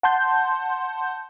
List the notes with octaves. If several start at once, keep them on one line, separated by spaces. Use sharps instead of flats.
F#5 A5 C6 G6